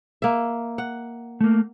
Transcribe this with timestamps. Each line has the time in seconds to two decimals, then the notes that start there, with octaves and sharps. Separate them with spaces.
0.22 A#3 E5
0.78 F#5
1.41 A3 A#3